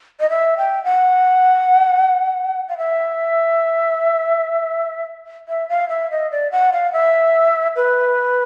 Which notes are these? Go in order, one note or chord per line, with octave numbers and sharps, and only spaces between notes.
D#5
E5
G5
F#5
F5
E5
E5
F5
E5
D#5
D5
F#5
F5
E5
B4